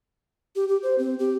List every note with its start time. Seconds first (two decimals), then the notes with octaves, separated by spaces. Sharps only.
0.55 G4
0.69 G4
0.83 C5
0.98 C4
1.19 G4